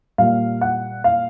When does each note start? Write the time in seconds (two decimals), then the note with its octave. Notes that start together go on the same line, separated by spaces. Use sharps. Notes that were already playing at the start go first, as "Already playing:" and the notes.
0.18 A#2 G3 A#3 F5
0.61 F#5
1.04 F5